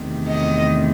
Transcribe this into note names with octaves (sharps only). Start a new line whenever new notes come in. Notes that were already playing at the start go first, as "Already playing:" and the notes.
Already playing: E2 C3 D#3 A3
D#5